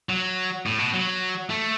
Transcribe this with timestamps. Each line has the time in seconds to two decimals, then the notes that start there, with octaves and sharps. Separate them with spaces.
0.09 F#3
0.66 A2
0.79 B2
0.94 F#3
1.50 A3